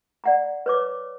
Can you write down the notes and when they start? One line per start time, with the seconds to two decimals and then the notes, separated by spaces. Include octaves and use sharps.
0.24 D5 F#5 A#5
0.66 B4 C#5 D6